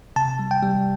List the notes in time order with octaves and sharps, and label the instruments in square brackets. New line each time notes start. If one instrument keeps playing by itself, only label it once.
[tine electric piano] C3 A5
G3
G5
G3